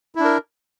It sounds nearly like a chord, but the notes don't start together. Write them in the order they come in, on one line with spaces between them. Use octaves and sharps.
E4 D4 A#4